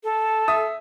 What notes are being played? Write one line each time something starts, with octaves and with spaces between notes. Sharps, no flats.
A4
E5 D#6